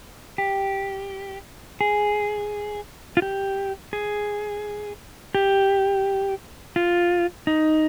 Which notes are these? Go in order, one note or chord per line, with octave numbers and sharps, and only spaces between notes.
G4
G#4
F4
G4
G#4
G4
F4
D#4